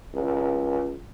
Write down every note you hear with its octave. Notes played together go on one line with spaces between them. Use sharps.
C#2